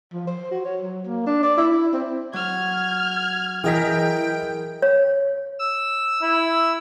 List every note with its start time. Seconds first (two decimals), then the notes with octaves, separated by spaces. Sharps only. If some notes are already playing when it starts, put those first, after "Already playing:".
0.13 F3
0.27 C5
0.51 F#4
0.65 C#5
0.81 F#3
1.07 A#3
1.26 D4
1.43 D5
1.58 E4
1.72 E4
1.93 C4
2.33 F#3 F6 G#6
3.64 E3 G#4 A#4 D#5 G5 B6
4.82 C#5
5.59 E6
6.22 E4